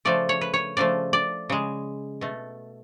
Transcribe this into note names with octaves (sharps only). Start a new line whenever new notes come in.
C#3 F3 A3 D5
C#5
B4
C#5
C#3 F3 A3 D5
D5
C#3 G#3
B2 A3